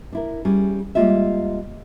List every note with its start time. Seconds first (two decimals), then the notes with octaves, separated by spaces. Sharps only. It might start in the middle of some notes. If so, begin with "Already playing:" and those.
0.12 D4 E4 A#4
0.45 G3 C#4 G#4
0.95 G3 G#3 A#3 F4 D#5 E5